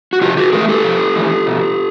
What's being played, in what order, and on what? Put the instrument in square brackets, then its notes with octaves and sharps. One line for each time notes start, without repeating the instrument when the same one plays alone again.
[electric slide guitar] F#4
C3 F4 G4
F#4 G#4
E3 A3 G#4 A#4
G4 A4
C3
E3 A3
B2